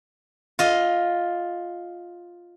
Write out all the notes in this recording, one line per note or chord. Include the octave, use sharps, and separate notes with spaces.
F4 D#5